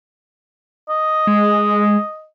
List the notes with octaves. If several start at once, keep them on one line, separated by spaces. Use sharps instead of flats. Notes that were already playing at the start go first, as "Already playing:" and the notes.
D#5
G#3